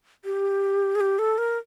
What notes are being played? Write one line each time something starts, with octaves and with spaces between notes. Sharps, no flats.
G4
G#4
G4
A4
A#4